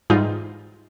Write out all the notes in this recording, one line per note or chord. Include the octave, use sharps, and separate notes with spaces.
G#2 E3 G3 D#4 F4